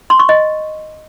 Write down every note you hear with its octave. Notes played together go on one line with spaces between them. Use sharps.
C6
C#6
D#5